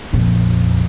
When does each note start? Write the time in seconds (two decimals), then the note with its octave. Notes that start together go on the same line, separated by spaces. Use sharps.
0.13 A#1 F2